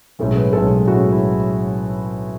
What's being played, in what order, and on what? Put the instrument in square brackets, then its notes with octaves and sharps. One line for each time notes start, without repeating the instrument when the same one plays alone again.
[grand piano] B1 A2 G#3 C#4 A4
B4
B1 A2 G#3 C#4 A4
B1 A2 G#3 C#4 F#4
E4